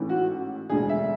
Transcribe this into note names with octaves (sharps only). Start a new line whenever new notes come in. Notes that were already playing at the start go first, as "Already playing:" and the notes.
Already playing: A1 G#2 E3
F#4
E1 D2 D3 G#4
E5